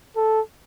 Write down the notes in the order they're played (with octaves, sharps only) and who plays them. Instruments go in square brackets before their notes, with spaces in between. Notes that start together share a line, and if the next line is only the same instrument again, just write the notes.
[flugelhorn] A4